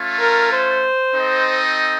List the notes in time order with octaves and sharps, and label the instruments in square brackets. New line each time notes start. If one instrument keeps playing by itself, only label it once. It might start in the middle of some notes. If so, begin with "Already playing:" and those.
Already playing: [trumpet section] A3 C#4 F4
[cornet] A#4
C5
[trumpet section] C4 D#4 A4 D#5